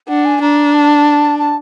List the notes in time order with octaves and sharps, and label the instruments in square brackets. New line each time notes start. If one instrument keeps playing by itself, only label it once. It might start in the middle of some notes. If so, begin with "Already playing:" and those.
[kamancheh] D4 [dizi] F#5
[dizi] G#5
[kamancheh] D4 [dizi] A#5
[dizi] A5
A5